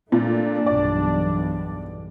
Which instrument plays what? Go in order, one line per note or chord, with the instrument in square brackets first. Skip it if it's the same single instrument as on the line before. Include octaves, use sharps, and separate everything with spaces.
[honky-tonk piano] A#2 [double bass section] A3 [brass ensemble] D4
[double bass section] B1 E2 G2 [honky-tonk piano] D5